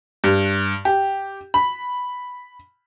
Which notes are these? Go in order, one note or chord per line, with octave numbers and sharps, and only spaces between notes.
G2
G4
B5